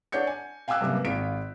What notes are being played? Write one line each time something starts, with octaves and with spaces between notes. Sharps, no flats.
D4 C#5 F#5 G6 C#7
G#5
F5 G5 G#5 D6 E6 F#6
F#2 C3 G3 A#3 B3
G#1 F4 B6 D7